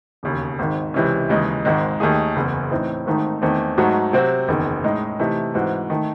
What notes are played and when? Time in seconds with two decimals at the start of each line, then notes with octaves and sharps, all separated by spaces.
0.23 E1 D#2 C#3
0.59 G#1 G#2 D#3
0.94 C#2 C3 E3 G#3 C#4
1.29 D#2 C#3 E3 G#3 D#4
1.65 G#1 G#2 D#3 G#3
2.00 D#2 D#3 A3 D#4 G#4
2.36 F#1 E2 C#3
2.71 A2 E3 C4 D#4
3.06 G#1 G#2 D#3 A3 D#4
3.42 E2 D#3 A3 C4
3.78 G#2 F#3 A3 D#4 F#4
4.13 C3 F#3 C4 F#4
4.48 F#1 E2 D#3
4.84 A2 G#3 D#4
5.19 C3 E3 A3 D#4
5.54 G#2 E3 C4 F#4
5.90 D#3 A3